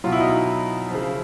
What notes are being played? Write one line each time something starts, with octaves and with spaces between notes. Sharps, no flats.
B2 F#3 F4
E4
D#4
E4
C#3 F3